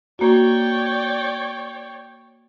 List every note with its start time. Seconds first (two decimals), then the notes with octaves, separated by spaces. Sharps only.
0.19 A#3 F#4 C#5 D5 G5